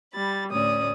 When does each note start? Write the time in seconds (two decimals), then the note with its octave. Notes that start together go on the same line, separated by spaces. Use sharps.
0.14 G3 B5 A6
0.51 D2 A2 C#4 D5 D#6